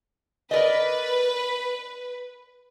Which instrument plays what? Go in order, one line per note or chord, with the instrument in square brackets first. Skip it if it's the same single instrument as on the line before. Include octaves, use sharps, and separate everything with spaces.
[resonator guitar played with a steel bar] A#4 D5 D#5 [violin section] B4